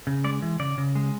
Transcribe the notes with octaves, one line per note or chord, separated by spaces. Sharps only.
C#3
G#3 D5
E3
C#3 D5
C#3
G#3